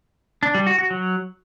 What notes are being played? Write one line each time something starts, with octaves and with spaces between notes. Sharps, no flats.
D4
G3
F#4
F#4
F#3